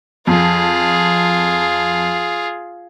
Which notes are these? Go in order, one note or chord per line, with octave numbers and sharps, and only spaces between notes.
F2 F4 G#4